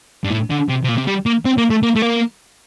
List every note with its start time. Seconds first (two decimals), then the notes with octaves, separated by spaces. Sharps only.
0.24 G2
0.31 A2
0.50 D3
0.69 C3
0.84 C3
0.88 A#2
0.97 C3
1.07 G3
1.26 A#3
1.45 C4
1.58 A#3
1.70 A3
1.83 A#3
1.96 A3
2.02 A#3